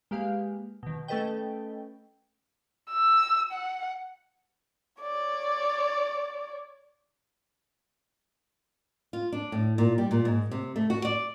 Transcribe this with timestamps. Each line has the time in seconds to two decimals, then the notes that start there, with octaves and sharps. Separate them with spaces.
0.11 G#3 A#3 G4 B4 F5
0.83 B2 D#3
1.08 A3 C#4 A4 B4 D#5 G5
2.91 E6
3.52 F#5
5.02 C#5 D5
9.13 F4
9.32 D4
9.52 A2
9.78 A#2
9.98 G3
10.11 A#2
10.25 G#2
10.51 C3
10.76 A3
10.90 F#4
11.05 D5